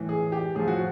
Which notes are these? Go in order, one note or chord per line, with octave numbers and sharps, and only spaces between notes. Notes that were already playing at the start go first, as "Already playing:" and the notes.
Already playing: A2 E3
G#4
G4
A2 F3 G#4
F#4